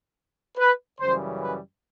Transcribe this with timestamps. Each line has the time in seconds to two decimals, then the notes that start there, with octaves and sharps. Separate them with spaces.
0.58 B4
1.00 F#2 C#3 E3 G3 C5
1.42 B4